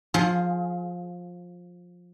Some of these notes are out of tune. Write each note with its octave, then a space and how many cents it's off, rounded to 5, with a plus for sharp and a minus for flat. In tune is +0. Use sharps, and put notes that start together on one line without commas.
F3 +20 F4 +0 G#4 +15